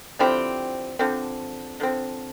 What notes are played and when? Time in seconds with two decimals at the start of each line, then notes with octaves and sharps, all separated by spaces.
0.19 D3 F3 C4 E4 G4
0.99 D3 F3 C4
1.80 D3 F3 C4